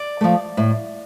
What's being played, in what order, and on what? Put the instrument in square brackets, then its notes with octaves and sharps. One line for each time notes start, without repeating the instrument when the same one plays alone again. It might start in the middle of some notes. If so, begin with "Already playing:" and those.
Already playing: [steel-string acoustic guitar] D5
F3 A3
A2